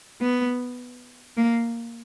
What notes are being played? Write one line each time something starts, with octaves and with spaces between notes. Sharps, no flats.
B3
A#3